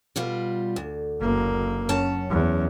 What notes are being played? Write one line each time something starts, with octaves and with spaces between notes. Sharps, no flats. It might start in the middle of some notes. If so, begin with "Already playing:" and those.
B2 G3 F4
D2
F#1 A#3
F#2 C#4 A5
E2